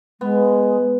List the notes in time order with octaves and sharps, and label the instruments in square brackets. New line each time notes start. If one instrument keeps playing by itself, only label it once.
[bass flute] G#3 [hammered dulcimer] B3